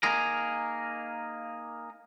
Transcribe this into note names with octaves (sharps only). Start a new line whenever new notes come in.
A#3 D#4 G#4 A#4